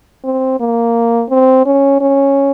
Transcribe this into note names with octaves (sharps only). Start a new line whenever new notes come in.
C4
A#3
C4
C#4
C#4